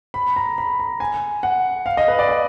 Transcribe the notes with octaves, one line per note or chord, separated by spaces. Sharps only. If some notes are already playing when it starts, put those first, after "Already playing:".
B5
A#5
B5
A#5
G#5
F#5
F5
D#5
B4
D5
D#5